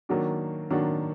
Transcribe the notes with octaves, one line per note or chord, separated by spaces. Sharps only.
D#3 F#3 A#3 D4 F#4
D#3 F#3 A#3 D4 F#4